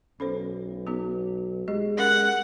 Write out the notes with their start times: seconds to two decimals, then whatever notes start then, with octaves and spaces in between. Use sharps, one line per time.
0.20 B1 C#4 A4 C5
0.87 B3 D#4 F#4
1.68 G#3 G4 D#5
1.98 C#4 G#4 A#4 F#5